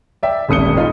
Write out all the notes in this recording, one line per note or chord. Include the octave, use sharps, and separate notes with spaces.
D5 E5 G5
D#1 G#1 D#6 C#7 G7
D#4 F4 G4